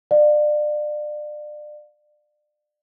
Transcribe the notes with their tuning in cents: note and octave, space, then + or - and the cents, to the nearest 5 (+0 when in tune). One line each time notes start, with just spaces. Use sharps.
D5 +30 F5 +35